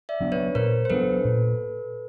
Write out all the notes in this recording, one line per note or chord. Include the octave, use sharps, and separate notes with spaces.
D5 E5
F#3 B3 D4
B4 C#5
A#2 A#4 C5
C5
F#3 B3 D4 A4 B4
A#2